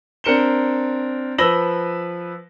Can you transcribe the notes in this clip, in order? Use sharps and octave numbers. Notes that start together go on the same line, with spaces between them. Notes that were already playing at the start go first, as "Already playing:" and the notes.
C4 D4 A#4 C#7 E7 G7
F3 B4 E6 A#6 F#7 G7